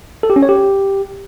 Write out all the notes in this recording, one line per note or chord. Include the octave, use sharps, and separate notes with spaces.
A4
G4
C#4
C#5
G4